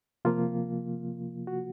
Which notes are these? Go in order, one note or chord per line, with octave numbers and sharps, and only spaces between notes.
C3 F3 A#3 F4
F#4